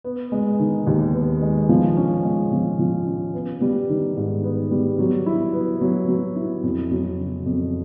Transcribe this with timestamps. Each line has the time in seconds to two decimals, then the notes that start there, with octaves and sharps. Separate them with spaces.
0.04 B3
0.32 G#3
0.59 D#3
0.87 D#2
1.14 B3
1.42 G#3
1.69 F3
1.97 C#4
2.24 G#3
2.52 F3
2.79 F3
3.07 C#4
3.34 B3
3.61 G3
3.89 D#3
4.16 G#2
4.44 B3
4.71 G3
4.99 F#3
5.26 E4
5.53 B3
5.81 F#3
6.08 F#3
6.36 E4
6.63 F2
6.91 F#3
7.19 C#3
7.46 F2